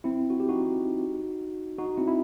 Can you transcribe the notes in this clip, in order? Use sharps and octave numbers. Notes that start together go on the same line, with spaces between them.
C4 E4
F#4
G4
D#4 F#4
D#4 F#4
C4 E4
E4